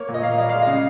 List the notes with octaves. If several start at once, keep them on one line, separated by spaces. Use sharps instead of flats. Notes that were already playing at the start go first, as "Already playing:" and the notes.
Already playing: A#3 C#5
A#2
D#5
A#2 F5
G3 D#5
G#3 F5
C#3 D#5